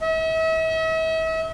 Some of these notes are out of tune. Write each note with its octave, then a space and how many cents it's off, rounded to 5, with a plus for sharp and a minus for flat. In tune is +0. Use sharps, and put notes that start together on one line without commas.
E5 -40